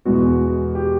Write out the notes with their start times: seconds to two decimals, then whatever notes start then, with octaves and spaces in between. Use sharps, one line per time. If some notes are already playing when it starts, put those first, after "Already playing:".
0.05 E2 B2 G#3 B3 F#4
0.75 G4